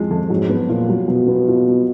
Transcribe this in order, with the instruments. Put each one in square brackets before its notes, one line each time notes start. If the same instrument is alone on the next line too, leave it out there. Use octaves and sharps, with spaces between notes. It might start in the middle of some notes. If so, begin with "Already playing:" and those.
Already playing: [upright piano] F2 F3 G#3
F2
[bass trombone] G#2 [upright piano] F#3
[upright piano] B3
[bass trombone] A#2 [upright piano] F4
[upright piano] F#3
[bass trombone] B2 [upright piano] F#3
[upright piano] B3
F4
F#3